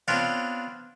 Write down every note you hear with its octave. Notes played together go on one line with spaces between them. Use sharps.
B3 C4 D4 F4 C#5